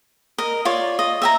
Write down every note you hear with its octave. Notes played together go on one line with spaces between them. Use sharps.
A#4 D#5
F4 C#5 D5
D#5
E5 G5 A#5